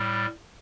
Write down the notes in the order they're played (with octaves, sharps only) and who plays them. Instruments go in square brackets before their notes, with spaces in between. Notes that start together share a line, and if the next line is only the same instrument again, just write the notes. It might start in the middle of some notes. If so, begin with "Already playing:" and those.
Already playing: [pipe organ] A2 G3